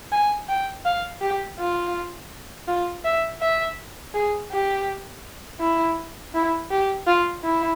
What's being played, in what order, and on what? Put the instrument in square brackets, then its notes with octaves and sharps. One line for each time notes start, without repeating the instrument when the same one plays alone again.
[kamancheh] G#5
G5
F5
G4
F4
F4
E5
E5
G#4
G4
E4
E4
G4
F4
E4